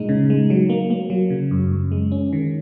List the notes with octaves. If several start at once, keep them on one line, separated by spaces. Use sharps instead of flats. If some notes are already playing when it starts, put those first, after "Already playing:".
Already playing: A#2 G#3 D#4
C#3
G#3
F#3
A#3
A#3
F#3
C#3
F#2
F#2
G#3
C#4
D#3